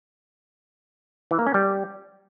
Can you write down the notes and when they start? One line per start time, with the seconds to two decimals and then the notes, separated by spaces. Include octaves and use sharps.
1.31 E3
1.39 A#3
1.46 C#4
1.54 G3